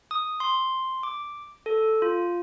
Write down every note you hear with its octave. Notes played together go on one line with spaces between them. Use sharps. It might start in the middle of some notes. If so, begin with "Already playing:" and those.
D#6
C6
D6
A4
F4